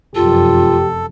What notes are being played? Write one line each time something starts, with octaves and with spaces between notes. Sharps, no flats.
F1 F#2 F4 G4 A4